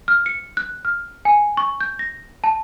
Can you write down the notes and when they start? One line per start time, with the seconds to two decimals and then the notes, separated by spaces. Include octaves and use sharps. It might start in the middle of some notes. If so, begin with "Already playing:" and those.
0.08 F6
0.26 C#7
0.57 F#6
0.85 F6
1.25 G#5
1.57 C#6
1.80 G6
1.99 A#6
2.44 A5